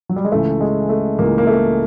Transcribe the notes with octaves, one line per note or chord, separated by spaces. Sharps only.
F#3
G3
G#3
C#2 C#3 E3 A3
G#3
A3
C#2 C#3 E3 A#3
A#3
A3